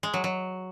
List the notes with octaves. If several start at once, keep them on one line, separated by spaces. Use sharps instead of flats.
G#3
F#3
F#3